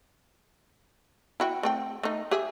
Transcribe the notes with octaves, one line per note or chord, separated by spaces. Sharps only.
E4 F#4 G5
A3 C4 G5
A3 D#4
G4 G#4 E5